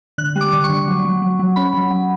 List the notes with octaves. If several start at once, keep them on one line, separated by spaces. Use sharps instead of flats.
D3 F#6
G3
D6
D3
C#6
D3
F#3
F#3
F#3
F#3
C#4 B5
F#3
F#3